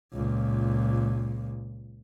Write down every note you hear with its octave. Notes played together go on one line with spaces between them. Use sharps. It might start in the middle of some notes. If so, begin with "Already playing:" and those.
C#2 A#2